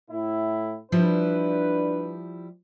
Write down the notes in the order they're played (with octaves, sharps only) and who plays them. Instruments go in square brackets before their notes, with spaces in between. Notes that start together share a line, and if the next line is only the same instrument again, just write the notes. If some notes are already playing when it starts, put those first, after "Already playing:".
[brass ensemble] A2 E4
[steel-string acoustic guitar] F3 G3 E4 [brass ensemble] D4 B4